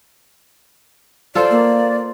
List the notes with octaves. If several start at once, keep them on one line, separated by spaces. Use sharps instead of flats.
F4 A4 C5 D5
A#3